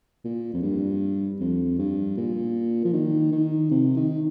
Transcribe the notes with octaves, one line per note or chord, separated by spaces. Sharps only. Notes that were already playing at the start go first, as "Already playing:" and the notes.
A#2
F2
G2
F2
G2
A#2
F3
D#3
D#3
C3
D#3